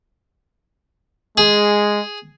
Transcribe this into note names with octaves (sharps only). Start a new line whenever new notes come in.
G#3 G#4